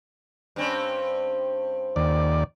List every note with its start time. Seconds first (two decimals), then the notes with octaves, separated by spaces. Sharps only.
0.56 G2 C4 C#4
1.96 D#2 D5